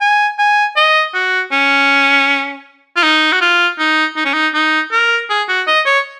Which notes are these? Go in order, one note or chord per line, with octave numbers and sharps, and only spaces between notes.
G#5
G#5
D#5
F#4
C#4
F4
D#4
F#4
F4
D#4
D#4
C#4
D#4
D#4
A#4
G#4
F#4
D#5
C#5